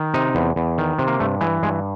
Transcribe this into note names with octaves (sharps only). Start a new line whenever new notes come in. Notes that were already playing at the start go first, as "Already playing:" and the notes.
Already playing: D#3
C3 D#4
E2
E2
D#3
C3
A#3
G2 A3
E3 G#3
G2 G#3